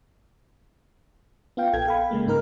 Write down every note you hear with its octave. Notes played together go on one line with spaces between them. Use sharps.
B3 F4 F5 G5
A#1 A4 G5 G#6
A4 F5 G5 B5
C#3 G#3 A#3
G#2 D#4 A#4 F6